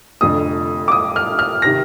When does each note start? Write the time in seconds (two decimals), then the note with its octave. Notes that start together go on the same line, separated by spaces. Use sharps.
0.21 F1 F2 D3 D#6
0.88 D6
0.92 D#6
1.16 F6
1.39 F6
1.62 C3 D#3 A#6